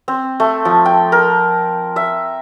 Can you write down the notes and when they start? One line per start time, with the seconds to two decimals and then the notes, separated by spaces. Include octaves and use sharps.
0.08 C4
0.40 A3
0.65 F3
0.85 G5
1.12 A#4
1.96 E5